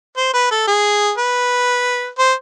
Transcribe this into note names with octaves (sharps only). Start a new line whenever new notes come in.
C5
B4
A4
G#4
B4
C5